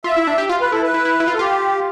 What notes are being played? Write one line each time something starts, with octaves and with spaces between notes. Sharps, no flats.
F4 E5
E4
D4
G4
F4
B4
E4 A4
B4
E4
E4
E4
F4
A4
F4 G4